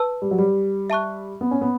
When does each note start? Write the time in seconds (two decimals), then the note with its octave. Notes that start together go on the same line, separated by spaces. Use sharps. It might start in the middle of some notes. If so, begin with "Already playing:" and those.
Already playing: B4 A5 E6
0.22 G3
0.31 F#3
0.39 G3
0.90 E5 A5 C#6 F#6
1.41 B3
1.51 C#4
1.61 B3